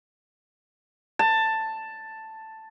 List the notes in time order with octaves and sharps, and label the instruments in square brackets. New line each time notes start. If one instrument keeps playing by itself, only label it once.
[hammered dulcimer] A5